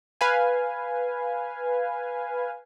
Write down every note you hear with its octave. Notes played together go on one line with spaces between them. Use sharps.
B4 F5 G#5